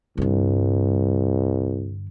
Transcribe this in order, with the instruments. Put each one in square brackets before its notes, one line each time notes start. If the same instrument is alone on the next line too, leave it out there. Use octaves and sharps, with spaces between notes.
[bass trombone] C2 [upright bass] G2 D3